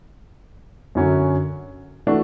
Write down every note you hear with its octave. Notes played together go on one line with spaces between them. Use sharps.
F#2 D3 F#3 C#4
E3 A3 D4 F#4